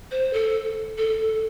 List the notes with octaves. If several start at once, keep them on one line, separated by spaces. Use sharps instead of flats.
C5
A4
A4